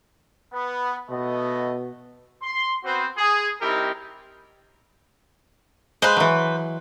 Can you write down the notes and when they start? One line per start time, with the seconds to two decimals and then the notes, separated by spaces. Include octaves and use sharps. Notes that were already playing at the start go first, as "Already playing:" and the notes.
0.54 B3
1.10 B2 A3 B3 D#5
2.43 C6
2.84 B3 C4 F#4 B4 C5
3.17 G#4
3.62 G3 C4 D#4 E4 G4 A#4
6.02 G#3 B4 C5 F5
6.16 E3 F#3